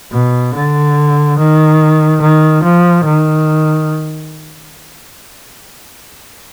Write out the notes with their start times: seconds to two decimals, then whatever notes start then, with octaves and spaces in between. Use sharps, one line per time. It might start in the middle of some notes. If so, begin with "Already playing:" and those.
0.12 B2
0.55 D3
1.38 D#3
2.21 D#3
2.63 F3
3.05 D#3